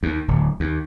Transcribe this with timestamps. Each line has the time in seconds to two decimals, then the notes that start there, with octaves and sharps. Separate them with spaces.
0.03 D#2
0.28 D1
0.60 D#2